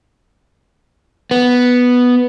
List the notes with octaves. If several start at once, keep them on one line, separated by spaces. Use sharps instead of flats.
B3